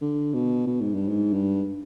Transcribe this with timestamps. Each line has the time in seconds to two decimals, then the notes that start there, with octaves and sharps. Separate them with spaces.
0.01 D3
0.34 B2
0.67 B2
0.81 G#2
0.94 G2
1.08 G#2
1.33 G2